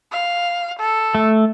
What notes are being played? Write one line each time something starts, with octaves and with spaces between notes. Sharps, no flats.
F5
A4
A3